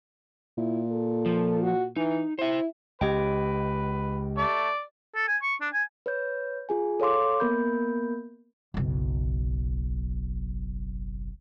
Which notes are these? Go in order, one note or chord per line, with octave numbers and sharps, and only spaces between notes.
A#2 E4
A4
F3
F#4
E3 D#4
E4 C5 E5
C#2 G4 B4 D#5 G5
A3 D5
A4
G#5
C#6
D4
G#5
B4 C#5 G6
F4 G#4 G#5
A4 C#5 F5 C6 D6
A#3 B3 A#4 B5 G6
F#1 B1